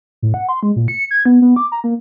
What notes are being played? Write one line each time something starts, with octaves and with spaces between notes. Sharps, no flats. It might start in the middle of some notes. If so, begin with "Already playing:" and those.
A2
F#5
C6
G#3
A#2
C#7
G#6
B3
B3
D6
A#5
A#3